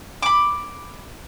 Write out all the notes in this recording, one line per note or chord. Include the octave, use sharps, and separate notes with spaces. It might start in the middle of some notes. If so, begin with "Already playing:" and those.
B5 D6